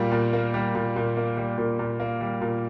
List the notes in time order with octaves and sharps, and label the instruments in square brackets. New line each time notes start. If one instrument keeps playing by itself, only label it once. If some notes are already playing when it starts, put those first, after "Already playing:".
Already playing: [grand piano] A#2 G3 A#3
A#2
A#3
G3
A#2
A#2
A#3
G3
A#2
A#2
A#3
G3
A#2